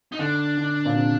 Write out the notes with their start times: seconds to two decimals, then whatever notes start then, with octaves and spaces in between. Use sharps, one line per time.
0.12 D#4
0.19 D3 D4
0.57 D3
0.85 A#2
0.95 C3